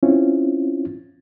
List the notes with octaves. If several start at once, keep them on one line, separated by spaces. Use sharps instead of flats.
C4 C#4 E4 F4